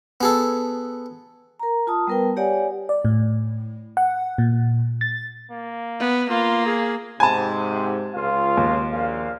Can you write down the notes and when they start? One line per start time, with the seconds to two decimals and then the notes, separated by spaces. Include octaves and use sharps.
0.21 B3 G#4 A4
1.60 A#4 A#5
1.87 F4 A5 D#6
2.07 G3 B3 A#4 B4 G5
2.37 G4 C#5 D5 F#5 G#5
2.89 D5
3.05 A2
3.97 F#5
4.38 A#2
5.01 A6
5.51 A#3
6.00 B3
6.30 A#3 F4
6.66 G#4
7.20 G#2 C3 G#5 A5
8.14 C#2 F4 F5
8.57 D#2
8.91 A#1 A#2 F5